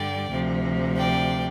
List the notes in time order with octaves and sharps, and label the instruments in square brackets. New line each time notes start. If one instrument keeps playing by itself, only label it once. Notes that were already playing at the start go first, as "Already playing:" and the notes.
Already playing: [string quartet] G2 D3 G3 D5 G5
D2 C3 F3
D5 G5